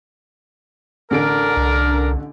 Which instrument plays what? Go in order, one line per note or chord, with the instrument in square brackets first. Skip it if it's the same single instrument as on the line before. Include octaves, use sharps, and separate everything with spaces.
[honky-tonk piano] A1 D3 D7 [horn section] D4 A#4
[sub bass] C2